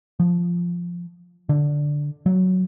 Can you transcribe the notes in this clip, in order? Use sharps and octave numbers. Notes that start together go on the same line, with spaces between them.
F3
D3
F#3